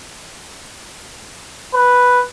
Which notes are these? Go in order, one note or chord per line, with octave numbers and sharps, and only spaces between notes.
B4